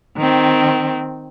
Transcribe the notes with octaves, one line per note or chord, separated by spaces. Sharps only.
D#3 C4